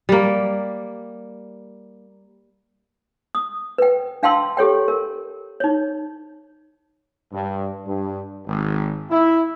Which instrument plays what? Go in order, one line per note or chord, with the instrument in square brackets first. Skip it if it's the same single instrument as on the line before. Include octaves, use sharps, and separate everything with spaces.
[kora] G3 A#3
[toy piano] D#6
B4 G5
D4 F5 G5 A5 C6 E6
G4 A4 C#5 G5
A#4
D#4 C#5
[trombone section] G2
G2
G#1
E4